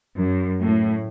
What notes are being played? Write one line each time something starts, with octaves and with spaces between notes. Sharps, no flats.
F#2
A2